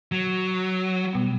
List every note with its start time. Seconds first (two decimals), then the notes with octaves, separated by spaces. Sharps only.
0.12 F#3
1.13 B2 G3 B3